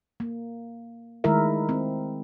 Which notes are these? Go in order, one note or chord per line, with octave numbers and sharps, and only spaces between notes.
A#3
D#3 G#3 A3 E4 A#4 E5
C4